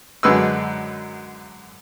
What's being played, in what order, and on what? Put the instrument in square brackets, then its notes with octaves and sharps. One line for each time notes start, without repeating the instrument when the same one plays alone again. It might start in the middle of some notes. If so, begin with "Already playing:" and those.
[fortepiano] F#2 D3 G#3 B4 E6